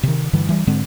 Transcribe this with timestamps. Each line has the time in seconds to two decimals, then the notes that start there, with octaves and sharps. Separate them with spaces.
0.03 C3 D#3
0.33 G2 D3 E3 G3
0.49 E3 G3
0.67 G#2 D3 G#3 C4